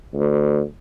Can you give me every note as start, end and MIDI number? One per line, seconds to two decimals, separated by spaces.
0.14 0.61 38